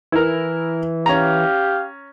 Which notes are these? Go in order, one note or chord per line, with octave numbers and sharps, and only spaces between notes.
E3 E4 A#4
C#4 G4 F5 A#5